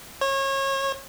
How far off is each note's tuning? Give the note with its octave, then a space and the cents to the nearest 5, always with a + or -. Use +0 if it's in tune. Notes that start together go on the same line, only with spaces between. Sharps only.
C#5 -30